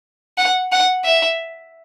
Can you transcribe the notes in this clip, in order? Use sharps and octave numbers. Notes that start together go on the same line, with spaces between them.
F#5
F#5
E5